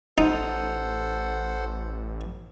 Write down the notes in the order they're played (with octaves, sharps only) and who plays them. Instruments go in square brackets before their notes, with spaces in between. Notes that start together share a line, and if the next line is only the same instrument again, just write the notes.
[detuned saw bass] A1 [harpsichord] D#4 [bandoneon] A4 C5 F#5